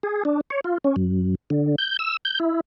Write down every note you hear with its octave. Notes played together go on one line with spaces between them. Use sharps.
G#4
D4
C#5
F4
C#4
F#2
D3
G6
E6
G6
E4